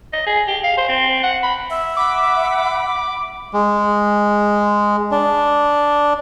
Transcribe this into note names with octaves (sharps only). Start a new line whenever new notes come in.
D#5
G#4
G4
F5
C5
C4
F#5
B5
E5
F#5 B5 D6
G#3
D4